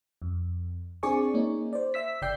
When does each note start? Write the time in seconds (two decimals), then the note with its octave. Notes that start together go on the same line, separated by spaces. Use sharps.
0.22 F2
1.03 C4 D4 G#4 D5 G#5 C#6
1.34 A#3 C#4 D#4
1.73 C5 D5
1.94 E5 E6 B6
2.22 G1 C#3 D5 G5 G6 C7